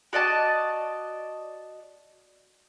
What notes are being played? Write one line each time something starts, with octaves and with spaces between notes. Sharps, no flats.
F#4 D5 D#5 A5